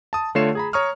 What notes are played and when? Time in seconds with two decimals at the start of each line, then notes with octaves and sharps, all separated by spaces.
0.13 A5 D#6
0.35 D3 A3 F4 C#5 C7 E7
0.55 G#4 A#5 B5
0.73 C#5 A#5 C#6 D#6 F6